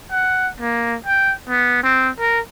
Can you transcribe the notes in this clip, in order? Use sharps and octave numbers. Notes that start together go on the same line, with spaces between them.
F#5
A#3
G5
B3
C4
A#4